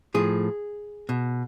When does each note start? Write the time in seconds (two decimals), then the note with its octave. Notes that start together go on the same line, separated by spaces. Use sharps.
0.14 A2 F3 G#4
1.09 B2